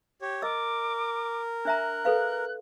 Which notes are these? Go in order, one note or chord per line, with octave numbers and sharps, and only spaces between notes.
G4 C#5
A#4 D#5 D6 E6
D4 E5 A#5 F#6
A4 B4 F5